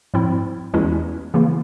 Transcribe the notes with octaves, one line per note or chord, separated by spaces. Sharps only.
G#2 F3 C4 E4
E2 E3 G#3 C#4 E4
C#3 E3 A#3 E4